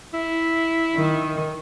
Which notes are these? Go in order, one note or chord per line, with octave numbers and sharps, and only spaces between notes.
E4
D#3